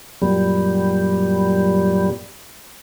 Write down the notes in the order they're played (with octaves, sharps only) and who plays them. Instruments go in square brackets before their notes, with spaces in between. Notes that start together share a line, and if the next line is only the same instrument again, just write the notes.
[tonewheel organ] F#2 A#2 G3